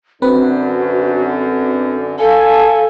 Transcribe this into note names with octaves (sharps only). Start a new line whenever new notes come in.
F#2 D3 C4 D4 F#4 B4
A4 F5 G#5 A5